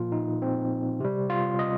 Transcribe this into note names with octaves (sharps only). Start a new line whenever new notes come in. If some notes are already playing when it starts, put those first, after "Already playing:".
Already playing: A#2 F3 F4
D#4
C4
C3 G3
F4
D#5